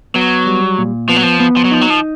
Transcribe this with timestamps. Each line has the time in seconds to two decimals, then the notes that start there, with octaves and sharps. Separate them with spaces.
0.14 F#3 B3
0.46 G3
0.78 A#2
1.09 F3 B3
1.16 F#3
1.23 F3
1.40 B3
1.56 F3
1.65 F#3
1.71 F3 D#4
1.81 F#3
1.90 F3